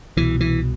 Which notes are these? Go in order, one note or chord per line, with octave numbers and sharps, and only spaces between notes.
C2 B2 E3
E3